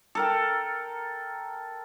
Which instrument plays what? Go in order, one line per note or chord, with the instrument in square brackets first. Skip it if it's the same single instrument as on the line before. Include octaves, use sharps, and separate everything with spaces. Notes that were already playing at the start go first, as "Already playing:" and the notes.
[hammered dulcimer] A4 A#4 G5